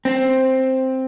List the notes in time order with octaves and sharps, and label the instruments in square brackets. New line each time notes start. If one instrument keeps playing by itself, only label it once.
[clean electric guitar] C4